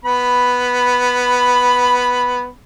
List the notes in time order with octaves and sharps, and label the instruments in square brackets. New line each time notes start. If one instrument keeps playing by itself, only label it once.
[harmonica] B3 B5